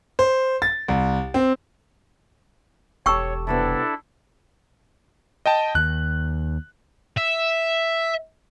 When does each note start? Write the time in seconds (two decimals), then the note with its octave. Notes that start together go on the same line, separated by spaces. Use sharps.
0.19 C5
0.62 A6
0.88 C2
1.34 C4
3.06 E1 G4 A4 C#5 G5 A5 C#6 E6
3.47 C3 G3 B3 D4 E4 A4
5.46 D#5 G5 A5
5.75 D#2 F#6
7.17 E5